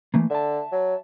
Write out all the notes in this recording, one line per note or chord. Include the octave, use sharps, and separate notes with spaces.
E3 A3 A#3
D3 E5 A5
F#3